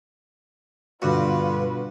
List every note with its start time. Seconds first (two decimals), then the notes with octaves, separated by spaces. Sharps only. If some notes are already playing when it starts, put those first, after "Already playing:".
1.02 G2 B2 D3 F4 F#4 B4